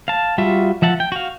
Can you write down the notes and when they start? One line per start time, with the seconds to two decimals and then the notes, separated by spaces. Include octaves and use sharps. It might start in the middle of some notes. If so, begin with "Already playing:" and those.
0.08 F5 A5
0.38 G3 F4 F#4 E5
0.82 F3 E5 F#5 A5
1.00 G5
1.12 F#4 F5